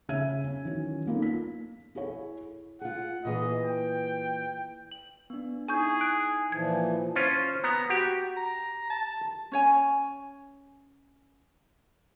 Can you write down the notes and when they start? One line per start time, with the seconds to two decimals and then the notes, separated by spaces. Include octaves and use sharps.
0.09 C#3 C#4 G#4 E5 G#6 D#7
0.44 C#4
0.65 D#3 E3 F#3 C#4
1.07 A#3 B3 C#4 D#4 F4 A4
1.22 B6
1.95 E4 G#4 A4 C#5
2.81 F4 G#4 F#5
3.25 A#2 E3 G#4 D#5
3.63 G5
4.91 F#7
5.30 B3 D4
5.69 D#4 E4 G#4 G#5 C#6 G6
6.01 F#6 D7
6.52 A#2 E3 F3 G#6
7.16 C#4 F4 C5
7.64 B3 A#5
7.90 F#4 G4
8.37 A#5
8.90 A5
9.52 C#4 C#5 G#5